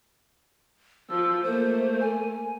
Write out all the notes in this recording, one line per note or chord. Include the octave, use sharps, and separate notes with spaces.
F3 E6
A3 A#3 C5
G#5